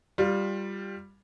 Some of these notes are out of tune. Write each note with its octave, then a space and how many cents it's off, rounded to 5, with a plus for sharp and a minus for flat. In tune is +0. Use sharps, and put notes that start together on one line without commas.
G3 +5 F4 +15